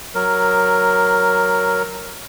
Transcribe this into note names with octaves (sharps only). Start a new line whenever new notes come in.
F#3 A#4